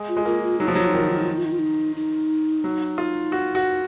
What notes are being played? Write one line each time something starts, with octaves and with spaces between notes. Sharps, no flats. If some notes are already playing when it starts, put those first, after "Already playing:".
Already playing: G#3
F4
G#3
A#3 F4
F4
F#3 D#4
F3 F4
F#3 D#4
F4
D#4
D#3 F4
D#4
F4
D#4
F4
D#4
F4
D#4
F4
D#4
D#4
F#3
F4
F#4
F#4